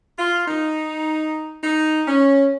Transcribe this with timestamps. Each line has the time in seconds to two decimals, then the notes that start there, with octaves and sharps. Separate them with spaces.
0.19 F4
0.48 D#4
1.64 D#4
2.08 C#4